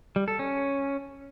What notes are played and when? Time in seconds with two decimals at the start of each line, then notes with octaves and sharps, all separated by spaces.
0.16 G3
0.28 A4
0.39 C#4